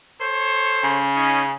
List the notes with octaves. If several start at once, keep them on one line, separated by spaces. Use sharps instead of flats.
A4 C5 C#5
C#3
C#4 D#4